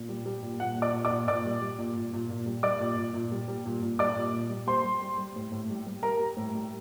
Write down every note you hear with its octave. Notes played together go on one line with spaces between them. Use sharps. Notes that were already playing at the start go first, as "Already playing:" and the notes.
Already playing: A#2
G3
G3
A#2
A#2 F#5
A#2
D5 D6
A#2
D5 D6
A#2
A#2 D5 D6
G3
G3
A#2
A#2
A#2
A#2
G3
G3 D5 D6
A#2
A#2
A#2
G3
G3
A#2
A#2
G3 D5 D6
A#2
A#2
G3
G3 C5 C6
G3
G3
G3
A2
A2
G3
G3
G3 A#4 A#5
G3
A2
G3